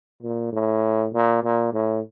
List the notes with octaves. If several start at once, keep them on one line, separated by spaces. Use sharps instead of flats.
A#2
A2
A#2
A#2
A2